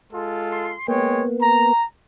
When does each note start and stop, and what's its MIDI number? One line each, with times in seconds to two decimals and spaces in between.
0.12 0.75 56
0.12 0.75 65
0.12 0.75 69
0.52 0.87 84
0.88 1.24 56
0.88 1.73 58
0.88 1.73 59
0.88 1.24 73
0.88 1.24 79
1.41 1.85 82